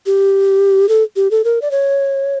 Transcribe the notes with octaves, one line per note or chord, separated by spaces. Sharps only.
G4
A4
G4
A4
A#4
D5
C#5